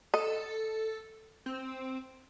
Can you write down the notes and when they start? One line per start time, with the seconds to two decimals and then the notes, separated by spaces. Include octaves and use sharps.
0.14 A4 D#5
1.46 C4